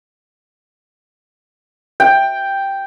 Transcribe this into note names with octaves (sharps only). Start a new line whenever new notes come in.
G5